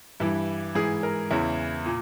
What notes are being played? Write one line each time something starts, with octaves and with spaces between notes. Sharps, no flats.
G2 E3 E4
G#2 E3 G#4
A#4
E2 C#3 E3 E4
A#2